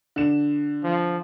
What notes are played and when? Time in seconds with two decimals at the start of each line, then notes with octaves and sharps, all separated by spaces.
0.16 D3 E7
0.84 F3